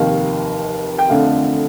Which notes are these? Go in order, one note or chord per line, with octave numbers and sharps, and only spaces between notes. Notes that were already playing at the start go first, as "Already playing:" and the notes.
Already playing: F1 D#2 D#3 F5
G5
F2 D3 A3 F5